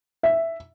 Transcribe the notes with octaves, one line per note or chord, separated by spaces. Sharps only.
E5